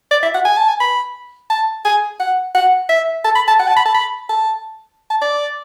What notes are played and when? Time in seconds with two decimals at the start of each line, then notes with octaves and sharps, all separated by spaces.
0.11 D5
0.23 E5
0.34 F#5
0.45 G#5
0.57 A5
0.68 G#5
0.80 B5
1.50 A5
1.85 G#5
2.20 F#5
2.55 F#5
2.89 E5
3.24 A5
3.36 B5
3.48 A5
3.59 F#5
3.68 A5
3.77 B5
3.85 A5
3.94 B5
4.29 A5
5.10 A5
5.22 D5